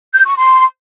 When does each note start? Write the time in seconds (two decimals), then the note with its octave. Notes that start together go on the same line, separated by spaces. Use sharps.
0.14 G6
0.26 C#6
0.38 C6